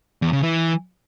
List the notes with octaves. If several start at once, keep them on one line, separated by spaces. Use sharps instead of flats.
E2
C#3
E3